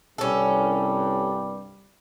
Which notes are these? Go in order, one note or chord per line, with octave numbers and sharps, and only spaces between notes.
C2 G2 G3 C#4 A4